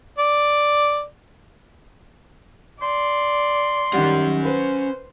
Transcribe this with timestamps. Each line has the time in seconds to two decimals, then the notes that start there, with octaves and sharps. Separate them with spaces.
0.19 D5
2.82 D5 C6
3.93 D#3 G3 C#4 F#5
4.45 B4 C5